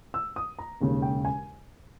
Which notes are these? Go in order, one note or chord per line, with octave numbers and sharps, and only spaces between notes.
E6
D#6
A#5
E1 D#2 C#3
G5
G#5